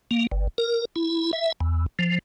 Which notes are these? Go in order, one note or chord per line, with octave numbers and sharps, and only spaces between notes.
A#3
G1
A#4
E4
E5
E2
F3